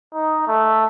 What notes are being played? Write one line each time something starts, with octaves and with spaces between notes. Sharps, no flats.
D#4
A3